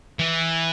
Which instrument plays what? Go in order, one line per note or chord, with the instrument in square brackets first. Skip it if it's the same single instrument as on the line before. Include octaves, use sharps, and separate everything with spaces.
[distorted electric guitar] E3